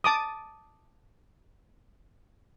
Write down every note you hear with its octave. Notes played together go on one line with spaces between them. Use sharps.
A5 D6 D#6